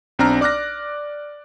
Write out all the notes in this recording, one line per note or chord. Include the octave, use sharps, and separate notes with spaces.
B1 C4 D4 A#5 F6
D5 D6 F6 F#6 A#6